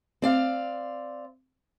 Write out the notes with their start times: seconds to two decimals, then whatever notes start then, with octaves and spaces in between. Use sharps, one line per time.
0.22 C4 D5 F5